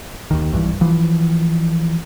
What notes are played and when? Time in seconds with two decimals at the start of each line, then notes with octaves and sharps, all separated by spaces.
0.31 D#2 D#3
0.52 B1 G2 E3
0.81 E3 F3